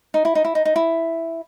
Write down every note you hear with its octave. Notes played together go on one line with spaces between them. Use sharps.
D#4
E4
D#4
E4
D#4
D#4
E4